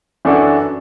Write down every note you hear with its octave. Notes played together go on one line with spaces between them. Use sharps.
F#2 E3 D4 F#4 A4